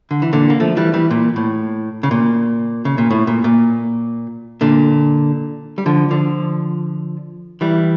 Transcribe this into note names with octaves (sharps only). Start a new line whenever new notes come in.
D3
E3
A#2 D3
A#3
F3 A3
E3 G3
E3 G3
A#2
A2
C#3
A#2
C#3
A#2
A2
A#2
A#2
A#2 D3
G3
D3 F3
D3 F3
E3 G3